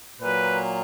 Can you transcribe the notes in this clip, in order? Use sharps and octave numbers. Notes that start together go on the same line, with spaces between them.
A#2 F#3 B4